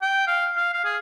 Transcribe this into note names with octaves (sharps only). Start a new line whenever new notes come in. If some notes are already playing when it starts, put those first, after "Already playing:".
G5
F5
F5
F5
G#4